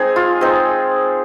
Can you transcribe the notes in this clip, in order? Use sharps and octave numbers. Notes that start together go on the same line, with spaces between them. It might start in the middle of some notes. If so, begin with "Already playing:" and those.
Already playing: G#3 C4 D#4 G#4
F4
G#3 C4 D#4